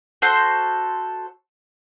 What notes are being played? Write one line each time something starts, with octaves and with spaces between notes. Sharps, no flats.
F#4 A4 C5